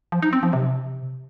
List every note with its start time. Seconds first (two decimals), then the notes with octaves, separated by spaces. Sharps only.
0.12 F3
0.22 D#4
0.33 C4
0.43 F3
0.53 C3